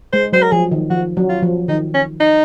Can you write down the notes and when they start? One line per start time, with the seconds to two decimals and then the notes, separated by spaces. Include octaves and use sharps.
0.13 G#3 C5
0.33 F#3 C5
0.42 A#4
0.52 F3 G#4
0.71 D#3
0.90 F3 F#4
1.17 F#3
1.29 F4
1.43 F3
1.68 D#3 D#4
1.94 C#4
2.20 D#4